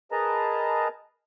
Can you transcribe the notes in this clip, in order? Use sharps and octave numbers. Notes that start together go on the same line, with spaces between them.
G#4 A#4 B4 D#5 A5 A#5